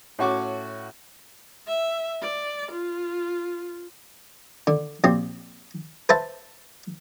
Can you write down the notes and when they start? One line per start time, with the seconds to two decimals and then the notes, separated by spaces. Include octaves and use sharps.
0.19 A2 C#4 F#4 C#6 D6
1.67 E5
2.22 D5
2.71 F4
4.67 D3
5.04 A#1 C4 G4
6.09 B4 C5 E5 F#5 A5